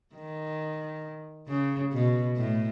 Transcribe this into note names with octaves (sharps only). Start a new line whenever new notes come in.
D#3
C#3
B2
A2